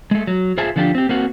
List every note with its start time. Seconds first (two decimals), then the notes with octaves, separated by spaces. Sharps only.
0.11 G#3 A3
0.27 F#3
0.58 F4 G#4 C5 E5 G#5 A5
0.76 D3 F3 D4 F4 G4
0.95 C4 G4
1.09 A#3 C4 F#4